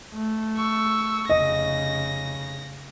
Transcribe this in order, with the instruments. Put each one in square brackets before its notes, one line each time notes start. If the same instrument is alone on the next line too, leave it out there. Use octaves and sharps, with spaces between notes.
[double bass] A3
[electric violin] C#6 E6
[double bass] F1 C#3 [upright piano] D#5 [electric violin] A#6